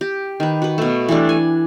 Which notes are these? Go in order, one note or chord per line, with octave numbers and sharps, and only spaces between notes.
G4
D#3 B4
F#4 B4
B2 A3
E3 G3 A3 D4
G#5